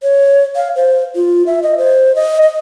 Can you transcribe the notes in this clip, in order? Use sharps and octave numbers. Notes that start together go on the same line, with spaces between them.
C#5
F5
C5
F4
E5
D#5
C5
D#5
D#5